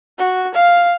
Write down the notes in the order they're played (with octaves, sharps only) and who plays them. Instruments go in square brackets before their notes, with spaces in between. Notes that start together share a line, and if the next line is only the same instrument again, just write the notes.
[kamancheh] F#4
F5